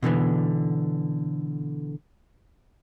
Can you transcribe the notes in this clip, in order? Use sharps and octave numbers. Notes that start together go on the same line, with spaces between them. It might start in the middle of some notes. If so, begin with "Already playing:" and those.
B2 D3 E3 B3